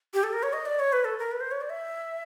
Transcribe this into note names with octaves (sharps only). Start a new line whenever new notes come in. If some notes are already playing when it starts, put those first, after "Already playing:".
G4
A4
A#4
C#5
D#5
D5
C#5
B4
A4
A#4
B4
C5
C#5
D5
E5